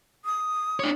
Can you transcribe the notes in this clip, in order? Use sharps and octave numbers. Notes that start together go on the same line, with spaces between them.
D#6
D4 C#5